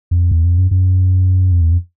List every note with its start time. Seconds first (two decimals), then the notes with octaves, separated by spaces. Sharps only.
0.11 F2
0.31 E2
0.45 F2
0.58 F#2
0.71 F#2
1.52 F2
1.61 E2
1.72 F2